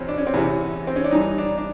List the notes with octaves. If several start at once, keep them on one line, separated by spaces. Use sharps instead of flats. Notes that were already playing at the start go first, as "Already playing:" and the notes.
Already playing: E2 B2 C4 C#4
D4
C#4
C4
E2 C3 E3 C#4
C4
C#4
D4
G2 E3 D#4
D4
D4